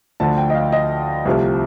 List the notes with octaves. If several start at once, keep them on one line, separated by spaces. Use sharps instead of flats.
D2 D3 F3 A5
G5
D#5
F5
D#5
C2 C3 F3 A3